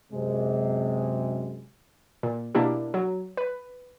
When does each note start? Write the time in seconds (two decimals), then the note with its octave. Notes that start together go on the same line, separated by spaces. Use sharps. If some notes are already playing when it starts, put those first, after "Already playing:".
0.13 F#2 C3 G#3
2.23 A#2
2.55 B2 A#3 D4 E4 G4
2.94 F#3
3.37 B4